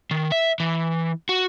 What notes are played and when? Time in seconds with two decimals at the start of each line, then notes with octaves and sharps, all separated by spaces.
0.11 D#3
0.32 E5
0.60 E3
1.29 F#4